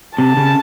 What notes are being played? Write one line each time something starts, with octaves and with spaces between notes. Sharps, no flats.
C3 A5
C#3